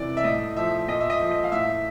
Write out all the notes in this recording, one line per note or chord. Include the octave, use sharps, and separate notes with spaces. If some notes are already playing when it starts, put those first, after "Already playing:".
Already playing: C3 E3 D5
E5
A2 D#5
F3 E5
A#2 D#5
E5
D#5
F3
D#5
F5
A2 E5